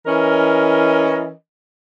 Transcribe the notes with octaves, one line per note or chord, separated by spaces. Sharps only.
E3 C#4 A#4 D#5